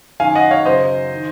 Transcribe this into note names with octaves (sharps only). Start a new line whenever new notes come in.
F#2 D#3 F5 G#5
D#5 F#5
C#5 F5
F#2 C#3 C5 D#5
D#3